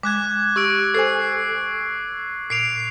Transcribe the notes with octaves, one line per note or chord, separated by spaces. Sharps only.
G#3 D6 F#6 G#6
G4 C#6 E6 D7
A4 C5 G#5 C7
A#2 C7 D7 F7